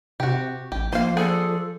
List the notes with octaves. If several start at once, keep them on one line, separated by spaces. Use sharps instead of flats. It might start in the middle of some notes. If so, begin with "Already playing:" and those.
C3 F#4 G4
A1 G4
F3 A#3 C5 F5
D4 G#4 A4 C5